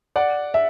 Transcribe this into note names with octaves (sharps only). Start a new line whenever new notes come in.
D5 F#5
E5